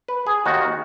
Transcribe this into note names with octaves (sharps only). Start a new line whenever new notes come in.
B4
G#4
D#2 D#3 F#4